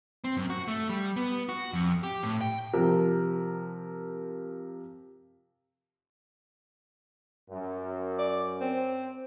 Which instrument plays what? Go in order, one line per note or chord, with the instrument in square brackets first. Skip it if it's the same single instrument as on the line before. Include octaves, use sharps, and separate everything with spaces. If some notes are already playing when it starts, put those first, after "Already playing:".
[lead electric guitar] C4
F#2
F#4
A3
G3
B3
F#4
F2
G4
A2
G5
[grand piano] C3 F3 A#4
[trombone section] F#2
[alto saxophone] D5
C4